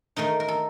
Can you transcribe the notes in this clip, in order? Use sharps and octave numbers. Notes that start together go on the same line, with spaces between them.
D#3 A3 D#4 A#4
A#4
A4